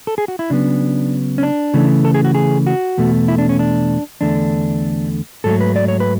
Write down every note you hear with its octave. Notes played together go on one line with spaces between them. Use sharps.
A4
G#4
F#4
E4
C#3 F#3 B3 D4
C#4
D4
C#3 E3 A3
A4
G#4
F#4
G#4
F#4
E2 B2 A3
E4
D4
C#4
D4
E2 D3 A3 D4
G#2 F#3 A3 A4
B4
D5
C#5
B4